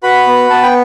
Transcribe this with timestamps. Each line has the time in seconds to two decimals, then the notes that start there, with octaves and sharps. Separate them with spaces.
0.03 F#4 B4 B5
0.27 B3
0.50 B3 A5
0.62 G5